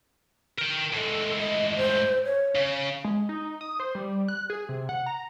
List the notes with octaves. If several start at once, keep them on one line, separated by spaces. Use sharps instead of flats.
A#4 G5
A2 G#3 A4
D#5
C5
C#5
C#3
G#3
D#4
D#6
C5
G3
F#6
G#4
C3
F#5
A#5